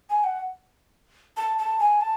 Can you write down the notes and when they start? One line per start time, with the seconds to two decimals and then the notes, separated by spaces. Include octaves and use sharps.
0.10 G#5
0.24 F#5
1.37 A5
1.58 A5
1.79 G#5
2.01 A5